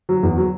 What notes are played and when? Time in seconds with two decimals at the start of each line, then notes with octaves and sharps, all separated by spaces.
0.09 F#3
0.23 E2
0.38 F#3